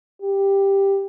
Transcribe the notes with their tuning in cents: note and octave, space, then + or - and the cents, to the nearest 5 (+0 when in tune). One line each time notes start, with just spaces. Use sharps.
G4 +5